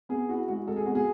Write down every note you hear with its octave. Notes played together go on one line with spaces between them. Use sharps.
B3 G#4
E4 F#4
G#3 F#4
G#3 A4
G#4
B3 F#4
G#4